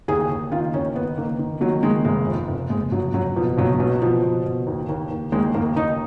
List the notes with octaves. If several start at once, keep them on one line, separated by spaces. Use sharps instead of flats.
D#2 G#4
D#2
D#3 F4
D#2 C#4
D#3 B3
D#3 A#3
D#3
D#3 F#3
D#3 G#3
F1 G#3
F2
F1
F1 G#3
F1 F#3
F1 F#3
B2 F3
B1 F#3
B2 F#3
B2 F3
B2
B2
D#2
D#2
D#2
D#2 G#3
D#2 A#3
D#2 D#4